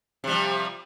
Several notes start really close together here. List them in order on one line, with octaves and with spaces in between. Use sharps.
C3 G3 F3